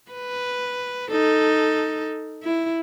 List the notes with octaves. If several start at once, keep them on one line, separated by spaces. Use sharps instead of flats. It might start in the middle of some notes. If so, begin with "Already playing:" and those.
B4
D#4 A4
E4